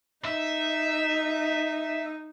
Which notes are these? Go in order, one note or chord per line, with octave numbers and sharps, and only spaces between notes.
D#4 E5